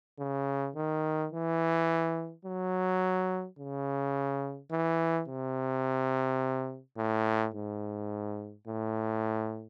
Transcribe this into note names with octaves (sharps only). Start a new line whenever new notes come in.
C#3
D#3
E3
F#3
C#3
E3
C3
A2
G#2
A2